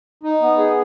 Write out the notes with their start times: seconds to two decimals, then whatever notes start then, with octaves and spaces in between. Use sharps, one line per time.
0.23 D#4
0.42 B3
0.58 G#4